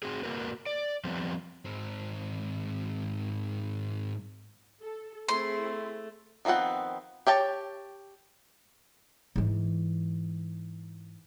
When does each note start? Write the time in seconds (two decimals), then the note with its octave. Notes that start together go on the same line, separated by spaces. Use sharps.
0.03 C4 F#4 G#4
0.23 A#3 F#4 A#4 B4
0.66 D5
1.05 F3 G3 B3 C4
1.65 G#2 C4
4.82 A4
5.29 A3 C4 E4 G#4 C6
6.45 D#3 F3 B3 C4 F#5
7.27 G4 C#5 G5 A5
9.36 G#2 E3